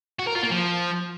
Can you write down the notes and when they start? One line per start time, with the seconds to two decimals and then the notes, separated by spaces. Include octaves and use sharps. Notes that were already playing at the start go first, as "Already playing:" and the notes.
0.19 F#4
0.27 A#4
0.35 F4
0.43 A#3
0.52 F3